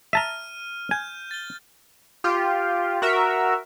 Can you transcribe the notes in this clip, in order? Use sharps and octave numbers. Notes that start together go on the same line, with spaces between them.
E5 A5 A#5 F6 D#7
G#5 G6
A6 G7
F4 G4
F#4 A#4 E5